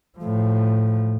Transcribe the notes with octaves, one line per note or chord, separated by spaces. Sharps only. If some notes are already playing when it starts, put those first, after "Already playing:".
A2 F3